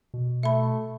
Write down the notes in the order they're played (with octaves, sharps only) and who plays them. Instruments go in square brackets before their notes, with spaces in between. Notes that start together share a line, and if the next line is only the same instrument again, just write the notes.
[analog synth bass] B2
[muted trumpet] A3 [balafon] E5 B5